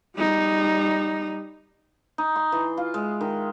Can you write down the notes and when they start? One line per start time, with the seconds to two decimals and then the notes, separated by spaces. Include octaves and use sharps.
0.17 G3 D#4
2.18 D#4
2.36 C6
2.52 E3
2.77 F4
2.94 G#3
3.21 D#3